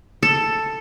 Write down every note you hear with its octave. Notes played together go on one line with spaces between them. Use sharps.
A4